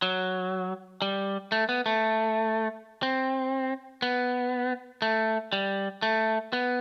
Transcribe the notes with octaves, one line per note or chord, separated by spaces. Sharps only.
F#3
G3
A3
B3
A3
C4
B3
A3
G3
A3
B3